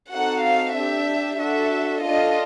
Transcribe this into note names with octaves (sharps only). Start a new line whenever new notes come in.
C4 D#4 F#4 A4 F#5
F5
D4 G4 E5
D4 F#4 A4 E5
D4 F4 A4 D#5